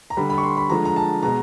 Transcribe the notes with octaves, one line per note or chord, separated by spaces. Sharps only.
A#5
D3 G3 B5
B5
C#6
C6
B5
D3 F3 G#3 A#5
A#5
A5
B2 G#3 A#5